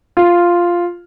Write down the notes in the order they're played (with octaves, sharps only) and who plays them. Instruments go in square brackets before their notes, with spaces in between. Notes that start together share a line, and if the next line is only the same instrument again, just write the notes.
[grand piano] F4